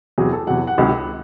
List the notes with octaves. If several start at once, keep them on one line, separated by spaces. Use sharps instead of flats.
E2 C3 F#3 G#4
A4
E2 C3 F#3 F#5
F#5
C#2 C3 D#3 F#3